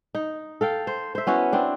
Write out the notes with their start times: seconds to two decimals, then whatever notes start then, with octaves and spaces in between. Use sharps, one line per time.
0.15 D#4
0.61 A4 F5 G5
0.87 C5
1.15 C5 E5
1.27 B3 C#4 E4 F#4
1.53 C4 D4